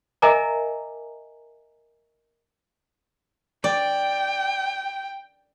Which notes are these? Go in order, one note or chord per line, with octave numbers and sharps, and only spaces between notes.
A#4 D#5 E5 G#5 A#5 D6
D5 G5